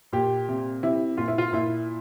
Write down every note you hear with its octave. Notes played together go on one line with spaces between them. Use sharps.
A#2 G4
C3
C3 E4
A#2 F4
E4
F4
A#2 E4